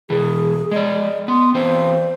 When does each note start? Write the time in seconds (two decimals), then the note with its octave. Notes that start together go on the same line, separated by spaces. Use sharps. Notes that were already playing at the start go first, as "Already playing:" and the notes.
0.10 B2 E3 G#4
0.71 G#3 D5 D#5
1.28 B3 C6
1.55 E3 C4 C5